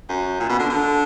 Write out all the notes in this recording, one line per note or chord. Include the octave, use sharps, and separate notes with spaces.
F#2
A#2
B2
D3
D3